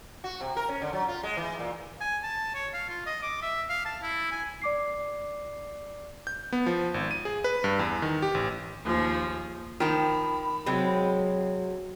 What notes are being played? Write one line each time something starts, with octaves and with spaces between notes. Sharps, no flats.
F#4
C3
A#4
C#4
D3
F#3
F4
G#3
E3
A#2
G#5
A5
C#5
F5
F4
D#5
D6
E5
F5
A5
E4
G#5
D5 D6 C7
G6
B3
F3
G#1
D#7
G#4
B4
G2
E2
D#3
G4
A1
D#2 F3 G#4
D#3 F3 G5 B5
C3 F#3 G#3 C4